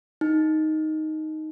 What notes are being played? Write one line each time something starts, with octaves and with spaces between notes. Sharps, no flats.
D#4